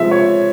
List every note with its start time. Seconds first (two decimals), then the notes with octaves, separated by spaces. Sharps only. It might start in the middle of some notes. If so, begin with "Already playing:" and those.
Already playing: C3 F3 G#3 E5
0.11 C#5